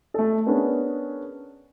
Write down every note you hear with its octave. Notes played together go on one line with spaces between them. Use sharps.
A3 A4
B3 C#4 D4 G#4 A#4 B4